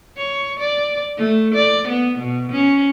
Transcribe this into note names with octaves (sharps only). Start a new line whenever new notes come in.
C#5
D5
A3
D5
B3
B2
C#4